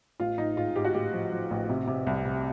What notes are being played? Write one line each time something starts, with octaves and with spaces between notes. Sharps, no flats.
A1 F4
A1 D#4
G#2 F4
G#2 G4
F#4
A1 G4
F3
F3
A1
C3
C3
C2
C3